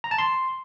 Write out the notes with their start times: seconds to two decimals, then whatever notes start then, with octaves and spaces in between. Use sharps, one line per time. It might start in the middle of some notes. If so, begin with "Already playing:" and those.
0.04 A#5
0.11 A5
0.18 C6